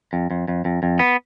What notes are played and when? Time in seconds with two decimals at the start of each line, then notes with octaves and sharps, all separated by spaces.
0.13 F2
0.31 F2
0.48 F2
0.65 F2
0.83 F2
0.99 B3